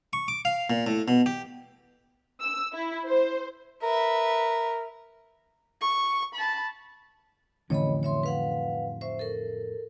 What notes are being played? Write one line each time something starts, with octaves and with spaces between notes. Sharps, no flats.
C#6
D6
F5
A#2
A2
B2
G4
E6
E4
C5
A#4 B4 E5
C#6
A5 B5
F2 A2 D3 E3 C#4 C#5 D#5 B5
C#5 E5 C6
B4 F5 F#5
C5 E5 C#6
A4 A#4